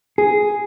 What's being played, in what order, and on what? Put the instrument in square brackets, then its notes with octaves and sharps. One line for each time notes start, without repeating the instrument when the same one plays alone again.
[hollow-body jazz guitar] G#4